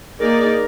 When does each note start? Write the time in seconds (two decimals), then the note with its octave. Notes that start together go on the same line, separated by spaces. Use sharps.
0.19 A#3 D#4 G#4 A#4 D5